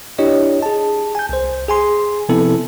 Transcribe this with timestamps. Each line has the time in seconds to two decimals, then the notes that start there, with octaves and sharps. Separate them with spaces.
0.18 D4 E4 G4 C#5 D#5
0.63 G#4 A5
1.15 G#5 G6
1.29 C2 C5
1.68 G#4 G#5 C6
2.29 C3 F3 B3 C4 E4 A4